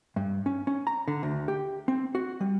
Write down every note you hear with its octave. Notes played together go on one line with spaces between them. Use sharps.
G2
C#4
C#4
A#5
D3
D2
G4
C4
F#4
G3